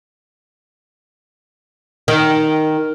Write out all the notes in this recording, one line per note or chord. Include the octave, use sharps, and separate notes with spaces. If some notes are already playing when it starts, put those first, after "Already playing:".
D#3